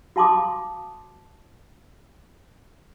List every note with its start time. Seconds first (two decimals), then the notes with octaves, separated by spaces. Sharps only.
0.16 F#4 F5 A5 C6 D6 D#6